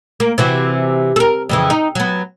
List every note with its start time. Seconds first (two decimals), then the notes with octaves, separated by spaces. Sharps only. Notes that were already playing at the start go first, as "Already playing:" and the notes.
0.20 A#3
0.38 C3 E3 F#4
1.16 A4 A#4
1.49 F2 C#3 E3
1.70 D#4
1.95 F#3 B3